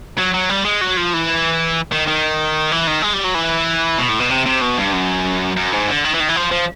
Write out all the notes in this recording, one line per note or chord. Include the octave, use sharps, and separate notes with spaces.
F#3
F#3
G3
G#3
F#3
F3
E3
D#3
D#3
E3
D#3
G#3
G3
F#3
E3
B2
A2
B2
C3
C3
B2
G2
F#2
F#2
G#2
D3
D#3
E3
D#3
E3
F3
F3